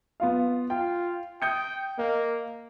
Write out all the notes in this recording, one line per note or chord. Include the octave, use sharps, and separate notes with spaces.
B3 F4 F5
F4 G5
G5 D#6 G6 C#7
A#3 D#5